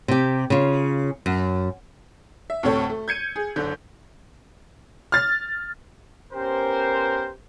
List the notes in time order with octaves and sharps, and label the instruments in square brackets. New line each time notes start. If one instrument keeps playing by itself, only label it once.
[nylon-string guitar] C3 G4
C#3 F4
F#2
[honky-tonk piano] E5
D2 A2 C3 C4 A4 C#5
A3
G6 G#6 C#7 D#7
G#4
F#1 D3 G6
F6 A6
[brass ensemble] B3 C#4 G4 A#4 C5